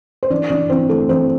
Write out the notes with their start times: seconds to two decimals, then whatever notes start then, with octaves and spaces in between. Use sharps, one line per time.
0.23 C5
0.30 E3 D4 D5
0.50 E3 D4 D5
0.70 E3 C4 C5
0.89 E3 A3 A4
1.09 E3 C4 C5